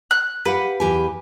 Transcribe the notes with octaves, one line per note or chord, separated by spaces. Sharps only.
F#6
G4 B4 F5 F#5
E2 G4 G#5